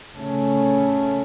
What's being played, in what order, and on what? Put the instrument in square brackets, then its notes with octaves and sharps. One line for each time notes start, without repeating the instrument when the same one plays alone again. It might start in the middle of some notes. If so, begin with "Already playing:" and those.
[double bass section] C#3 A3 C#4